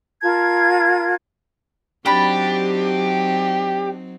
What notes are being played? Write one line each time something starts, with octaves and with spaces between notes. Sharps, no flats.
F4 A#4 A5 G#6
F#3 C4 D4 D#4 G4 B5